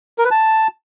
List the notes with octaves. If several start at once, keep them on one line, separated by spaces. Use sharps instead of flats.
A#4
B4
A5